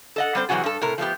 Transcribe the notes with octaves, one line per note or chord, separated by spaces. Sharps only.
A4 D#5 F#5
G3 C4 C5
C3 E3 F#3 F4 F#4 G#4
G2 A4
A2 C3 A#4
F3 A3 B3 G4